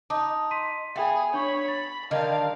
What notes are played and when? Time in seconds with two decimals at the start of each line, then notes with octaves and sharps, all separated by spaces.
0.10 D#4 A5 D6 D#6
0.51 C6 B6 D#7
0.96 B3 G#4 E5 G5 B5
1.34 D4 C#5 B5 C#6
1.68 B5 A6
2.11 D3 D#3 G3 A#4 F5 A5